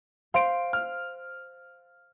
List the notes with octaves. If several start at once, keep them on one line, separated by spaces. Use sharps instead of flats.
C5 F5 C6 D7
F6